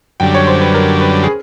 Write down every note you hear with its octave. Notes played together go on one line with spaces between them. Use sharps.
F#2 D3 G3 G5
C#5
C5
B4
A#4
B4
G#4